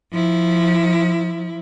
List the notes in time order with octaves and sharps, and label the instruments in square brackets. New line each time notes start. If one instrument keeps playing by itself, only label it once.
[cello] F3 E4